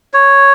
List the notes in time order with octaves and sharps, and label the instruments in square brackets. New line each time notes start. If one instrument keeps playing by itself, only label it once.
[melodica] C#5